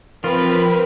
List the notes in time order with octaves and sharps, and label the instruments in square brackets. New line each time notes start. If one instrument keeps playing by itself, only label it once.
[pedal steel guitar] F3 F4 [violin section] C4 B4 [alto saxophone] A#4